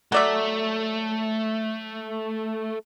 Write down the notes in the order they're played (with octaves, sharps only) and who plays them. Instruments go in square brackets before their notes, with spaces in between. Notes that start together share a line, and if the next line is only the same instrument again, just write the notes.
[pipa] F#3 D5 E5 [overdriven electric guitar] A3